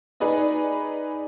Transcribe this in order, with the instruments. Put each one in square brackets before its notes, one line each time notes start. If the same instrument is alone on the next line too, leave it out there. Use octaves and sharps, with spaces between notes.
[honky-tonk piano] D#4 G#4 B4 D5 D#5